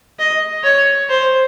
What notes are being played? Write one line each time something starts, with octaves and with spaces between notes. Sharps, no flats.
D#5
C#5
C5